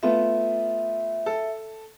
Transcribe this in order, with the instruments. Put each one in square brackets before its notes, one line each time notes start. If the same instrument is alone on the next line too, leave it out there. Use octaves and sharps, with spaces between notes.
[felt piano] A3 B3 F4 [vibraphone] E5
[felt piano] A4